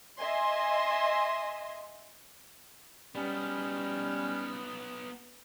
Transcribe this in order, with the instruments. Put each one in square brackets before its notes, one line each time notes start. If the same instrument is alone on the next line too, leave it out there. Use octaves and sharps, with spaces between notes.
[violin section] D#5 E5 G#5 C6
[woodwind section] G3 C#4 [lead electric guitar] B3 D#4